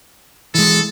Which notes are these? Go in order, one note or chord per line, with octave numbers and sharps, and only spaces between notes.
E3 G#3 A4